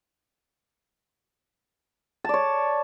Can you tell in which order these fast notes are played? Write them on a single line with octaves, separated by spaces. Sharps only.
A5 D5 C#5